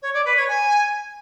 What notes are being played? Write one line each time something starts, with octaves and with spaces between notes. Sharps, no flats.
C#5
D5
B4
C#5
G#5